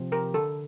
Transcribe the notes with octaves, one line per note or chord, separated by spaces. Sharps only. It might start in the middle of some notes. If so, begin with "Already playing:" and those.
Already playing: C3 F3 C4
G4 A#4
D3 A4